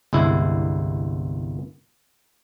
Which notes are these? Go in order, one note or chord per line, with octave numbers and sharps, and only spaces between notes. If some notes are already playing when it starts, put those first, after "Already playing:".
G1 C2 G#3 E4